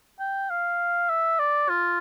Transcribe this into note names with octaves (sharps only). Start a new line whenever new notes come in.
G5
F5
E5
D5
F4